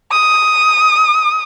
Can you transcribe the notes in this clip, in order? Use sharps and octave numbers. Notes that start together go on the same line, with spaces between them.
D#6